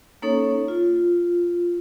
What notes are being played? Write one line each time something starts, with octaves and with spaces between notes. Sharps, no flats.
A#3 C#4 D#4 A4 C#5
F4